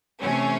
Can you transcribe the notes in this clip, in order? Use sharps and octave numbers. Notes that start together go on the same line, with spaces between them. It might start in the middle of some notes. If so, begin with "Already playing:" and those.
C3 E3 A3 C#4